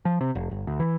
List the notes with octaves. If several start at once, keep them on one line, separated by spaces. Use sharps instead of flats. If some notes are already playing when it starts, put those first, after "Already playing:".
F3
C3
F1
G1
D2
E3